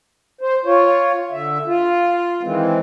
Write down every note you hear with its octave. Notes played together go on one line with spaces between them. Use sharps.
C5
F4 C#5
D3 E5
F4
D#3 E3 G#3 C4